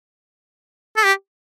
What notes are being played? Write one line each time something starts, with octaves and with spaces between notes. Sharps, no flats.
A4
G4